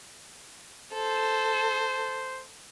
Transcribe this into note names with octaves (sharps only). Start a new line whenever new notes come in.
A4 C5